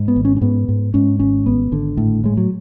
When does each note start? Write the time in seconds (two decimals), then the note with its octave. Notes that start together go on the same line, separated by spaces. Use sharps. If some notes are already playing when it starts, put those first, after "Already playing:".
Already playing: G#2
0.08 B3
0.16 G#1
0.25 C#4
0.37 C#4
0.41 G#2 B3
0.69 G#2
0.94 G#2 C#4
1.19 G#1 C#4
1.46 G#1 B3
1.72 G#1 D3
1.97 A2
2.24 A2 G#3
2.37 F#3